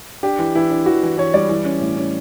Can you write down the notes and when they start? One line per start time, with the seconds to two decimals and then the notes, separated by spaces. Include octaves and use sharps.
0.23 D4 G4
0.39 E3
0.55 E3 E4
0.70 D4
0.86 E3 F#4
1.03 E3
1.18 E3 C#5
1.34 G3 D5
1.49 E3
1.65 C#4
1.81 A2
1.97 C#4